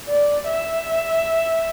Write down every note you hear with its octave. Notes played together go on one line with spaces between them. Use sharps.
D5
E5